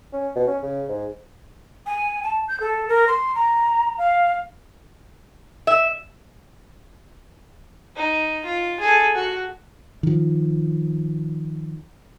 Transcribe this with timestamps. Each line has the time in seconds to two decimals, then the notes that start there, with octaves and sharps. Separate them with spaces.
0.13 C#4
0.36 B2
0.47 C#4
0.63 C#3
0.88 G#2
1.86 G#5
2.23 A5
2.48 G6
2.60 A4
2.88 A#4
3.07 C6
3.34 A#5
3.98 F5
5.67 E5
7.96 D#4
8.45 F4
8.80 G#4 A4
9.15 F#4
10.03 D#3 F3